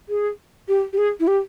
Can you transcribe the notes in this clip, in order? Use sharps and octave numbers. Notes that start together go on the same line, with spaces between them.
G#4
G4
G4
G#4
E4
G4